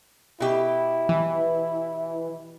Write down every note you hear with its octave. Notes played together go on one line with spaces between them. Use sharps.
B2 E4 G4
E3